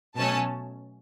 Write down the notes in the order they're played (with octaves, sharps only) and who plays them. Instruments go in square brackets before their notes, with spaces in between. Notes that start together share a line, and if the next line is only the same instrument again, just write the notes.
[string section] B2 F#3 A3 C#4 A5